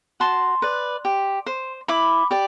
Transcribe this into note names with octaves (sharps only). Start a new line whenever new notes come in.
F#4 A5 C6
B4 D5
G4
C5
E4 B5 D6
G4 D5